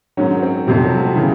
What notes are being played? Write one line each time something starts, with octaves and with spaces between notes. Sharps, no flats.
G#2 D#3 F#3 C#4
C4
F2 C3 F3 G3
F#3
G3
C#3 E3